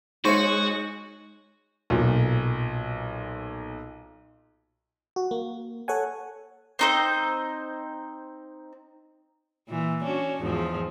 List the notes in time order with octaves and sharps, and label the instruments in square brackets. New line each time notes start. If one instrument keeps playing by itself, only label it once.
[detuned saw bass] G#3 [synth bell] D#4 C#6 D#7 [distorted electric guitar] F#4 [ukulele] C5 C#5
[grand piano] B1 A#2
[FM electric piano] F#4
A#3
A4 C#5 F#5 G#5
[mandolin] C4 D#4 C5
[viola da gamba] A#2 E3
C#4 D4 F#4
E2 G#2 F3